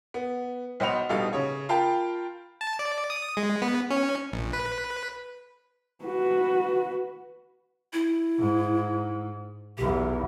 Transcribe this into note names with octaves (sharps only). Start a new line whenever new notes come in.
B3
B1 C5 D#5 F#5 B5 F7
A#1 B2 G3 D#4 A4 F5
C#3 C#5
F4 A#4 F5 G5 A5 B5
A5
D5
D#6
G#3
B3
C#4
A#1
B4
F#4 B4
E4
G#2
B1 E2 G4